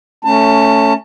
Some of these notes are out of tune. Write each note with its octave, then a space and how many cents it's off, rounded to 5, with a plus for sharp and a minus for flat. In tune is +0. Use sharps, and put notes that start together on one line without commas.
A3 +0 C#4 +0 A5 +30